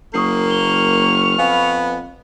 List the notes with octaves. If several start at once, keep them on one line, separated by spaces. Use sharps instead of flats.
F#1 A#3 C#6 D#6 C7
C#6 F6 G7
F2 B3 F5 G#5 B5